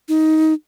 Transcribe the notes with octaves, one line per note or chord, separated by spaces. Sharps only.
D#4